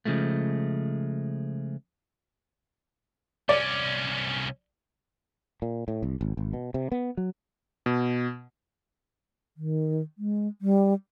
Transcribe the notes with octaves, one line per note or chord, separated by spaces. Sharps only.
C#3 F3 G#3 A3
C2 C#4 D5
A#2
A2
C2
G#1
G#1
B2
C3
B3
F#3
B2
D#3
G#3
G3